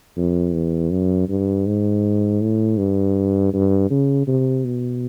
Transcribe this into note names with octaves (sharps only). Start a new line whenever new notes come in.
F2
E2
F#2
G2
G#2
A2
G2
G2
C#3
C3
B2